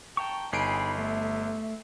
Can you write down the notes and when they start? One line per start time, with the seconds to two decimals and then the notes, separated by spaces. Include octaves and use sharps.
0.17 G5 A5 A#5 C#6
0.53 G1 D#4 G#4 G5 G#5 B5 C7 D7
0.98 A3 E5